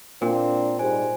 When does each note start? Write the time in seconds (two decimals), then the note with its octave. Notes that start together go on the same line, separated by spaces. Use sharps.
0.22 A#2 A#3 C4 D4
0.79 G#2 G3 C5 G#5